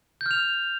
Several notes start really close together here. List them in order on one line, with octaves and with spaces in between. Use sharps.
G6 F6 F7